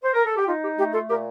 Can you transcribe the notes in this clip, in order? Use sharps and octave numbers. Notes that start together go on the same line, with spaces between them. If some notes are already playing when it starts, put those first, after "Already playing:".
C5
A#4
A4
G4
D#4 F4
G4
A3 G4
F4 A4
A#2 G4 A#4